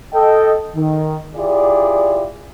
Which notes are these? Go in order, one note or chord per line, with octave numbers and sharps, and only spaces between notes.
A4 D#5 G5
D#3
E4 F4 G4 G#4 D5